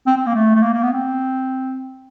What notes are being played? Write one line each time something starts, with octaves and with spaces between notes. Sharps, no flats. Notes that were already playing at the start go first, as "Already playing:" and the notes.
C4
C4
A#3
A3
A3
A#3
A#3
B3
C4